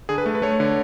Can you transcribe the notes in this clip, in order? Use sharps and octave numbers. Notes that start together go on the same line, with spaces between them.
D3 G#4
B4
A3
B4
A3 C#5
D3